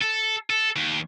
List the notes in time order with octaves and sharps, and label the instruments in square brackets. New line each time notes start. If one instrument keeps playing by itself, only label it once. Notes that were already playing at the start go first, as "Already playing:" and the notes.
[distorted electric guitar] A4
A4
D#2